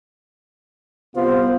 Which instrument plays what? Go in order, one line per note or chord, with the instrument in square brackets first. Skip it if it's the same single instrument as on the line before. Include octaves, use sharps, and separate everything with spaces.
[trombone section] C2 F4 [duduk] B3 [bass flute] C5